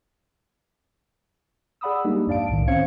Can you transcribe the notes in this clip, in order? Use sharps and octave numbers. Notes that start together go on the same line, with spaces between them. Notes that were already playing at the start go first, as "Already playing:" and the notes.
G#4 D5 F#5 B5 D#6 E6
G3 G#3 A#3 D4 D#4 G4
F2 G#2 D5 F5 A5 D7
C2 A2 D#3
C4 C#4 C5 F5 G#6 C#7